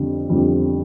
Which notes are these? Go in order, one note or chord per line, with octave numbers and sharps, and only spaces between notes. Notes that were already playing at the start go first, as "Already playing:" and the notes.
Already playing: F2 D3 G3 C4
F2 D3 G3 C4